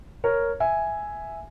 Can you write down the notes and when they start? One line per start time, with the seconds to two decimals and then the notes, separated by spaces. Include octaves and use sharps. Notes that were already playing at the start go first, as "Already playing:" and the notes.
0.24 A#4 C#5
0.60 E5 G#5